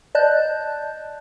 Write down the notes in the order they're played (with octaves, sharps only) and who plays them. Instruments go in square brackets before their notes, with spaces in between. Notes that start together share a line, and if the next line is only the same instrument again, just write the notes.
[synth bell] D5 D#5 A5 F#6 G6